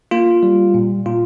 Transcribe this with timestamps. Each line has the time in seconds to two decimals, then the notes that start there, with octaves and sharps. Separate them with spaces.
0.11 A#3 F4
0.43 G3
0.74 A#2
1.06 A#2 F4